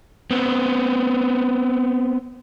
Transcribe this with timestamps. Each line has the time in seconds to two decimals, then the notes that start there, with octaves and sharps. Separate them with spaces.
0.31 B3 C4